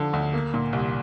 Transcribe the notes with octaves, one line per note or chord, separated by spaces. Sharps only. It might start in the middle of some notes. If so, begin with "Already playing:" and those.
Already playing: D3 F3
D2
A#3
A#2
C2